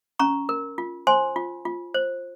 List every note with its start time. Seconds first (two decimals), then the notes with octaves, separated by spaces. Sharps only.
0.19 C#4 A#5 C#6
0.49 A#4
0.78 F4
1.07 C5 G#5 C6
1.36 F4
1.65 F4
1.94 C5